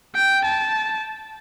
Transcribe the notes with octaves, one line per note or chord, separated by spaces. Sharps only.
G5
A5